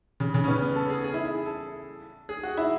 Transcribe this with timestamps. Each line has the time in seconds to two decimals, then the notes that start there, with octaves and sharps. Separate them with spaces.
0.20 C#3
0.34 C#3
0.44 C#4
0.48 B3
0.62 B3
0.76 A4
0.90 G#4
1.04 G#4
1.14 E4
1.25 E4
1.35 G#4
1.46 A4
2.29 G#4
2.43 F#4
2.57 E4